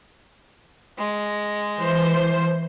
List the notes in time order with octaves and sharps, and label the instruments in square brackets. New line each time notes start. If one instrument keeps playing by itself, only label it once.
[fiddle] G#3
[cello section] E3 [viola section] C5